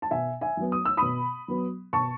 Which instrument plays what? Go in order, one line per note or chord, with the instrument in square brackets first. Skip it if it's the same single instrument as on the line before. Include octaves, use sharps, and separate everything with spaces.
[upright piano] A5
B2 E5 G#5
E5 G#5
F#3 B3
D#6
E6
B2 B5 D#6
F#3 B3
B2 A5 C#6